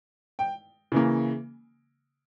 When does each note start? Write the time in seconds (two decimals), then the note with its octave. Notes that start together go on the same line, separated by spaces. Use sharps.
0.39 G5
0.92 C#3 E3 A#3